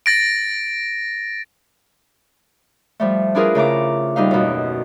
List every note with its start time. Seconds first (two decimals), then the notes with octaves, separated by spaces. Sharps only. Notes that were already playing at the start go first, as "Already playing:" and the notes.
0.06 A6 A#6 D7
3.00 F3 G3 A3
3.35 D4 E4 F4 G#4 A#4 B4
3.55 C#3 A3 A#5 D6
4.16 D#2 G3 D#4 F5
4.31 F#2 B2